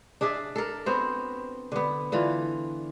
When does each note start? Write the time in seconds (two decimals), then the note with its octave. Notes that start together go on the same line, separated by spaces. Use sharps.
0.21 D4 G#4 D5 E5
0.56 A4 A#4
0.86 B3 C4 F#4 C5
1.72 D3 B3
2.12 D3 E3 F4